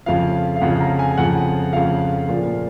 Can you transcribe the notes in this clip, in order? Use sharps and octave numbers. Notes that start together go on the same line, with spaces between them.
F2 C#3 F3 F5
F5
F2 C#3 F3 F#5
A#5
G#5
G#5
F2 C#3 F3 F#5
F2 C#3 F3 F5
A#2 F3